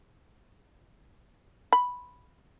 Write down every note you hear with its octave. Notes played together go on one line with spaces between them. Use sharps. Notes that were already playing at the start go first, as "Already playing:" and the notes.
B5